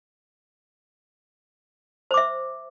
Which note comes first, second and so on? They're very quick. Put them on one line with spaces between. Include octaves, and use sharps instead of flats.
C5 D6 E5